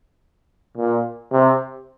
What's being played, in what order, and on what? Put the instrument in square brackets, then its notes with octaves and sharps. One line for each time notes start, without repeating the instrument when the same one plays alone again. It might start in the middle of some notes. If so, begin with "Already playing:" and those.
[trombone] A#2
C3